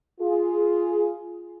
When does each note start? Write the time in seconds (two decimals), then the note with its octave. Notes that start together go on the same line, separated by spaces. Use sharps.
0.21 F4 G#4